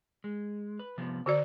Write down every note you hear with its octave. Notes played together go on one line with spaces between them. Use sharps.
G#3
B4
C3 F3 B3
D3 F#4 A#4 D5